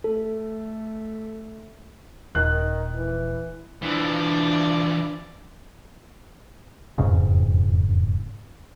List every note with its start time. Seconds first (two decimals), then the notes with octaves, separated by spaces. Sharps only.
0.04 A3 A4
2.35 D#1 D#3 F#6
2.94 E3
3.83 E3 F3 D4 D5
6.98 E1 F2 G#2 C#3